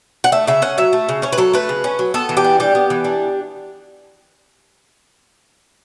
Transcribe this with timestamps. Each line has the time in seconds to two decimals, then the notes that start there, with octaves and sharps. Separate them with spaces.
0.24 F#5
0.32 A3 E5
0.47 C#3 E5
0.62 C#4 F#5
0.78 F#3 E5
0.93 A3
1.09 C#3
1.22 C#4 C#5
1.33 B4
1.38 F#3 A4
1.53 A3 B4
1.69 C#3
1.84 C#4
1.99 F#3
2.14 B3 A4
2.29 E3
2.37 G4
2.44 D4
2.60 G3 G4
2.75 B3
2.90 E3
3.04 D4